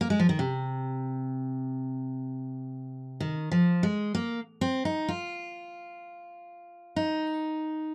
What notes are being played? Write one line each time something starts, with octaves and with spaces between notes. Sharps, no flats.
A#3
G#3
F3
D#3
C3
D#3
F3
G#3
A#3
C4
D#4
F4
D#4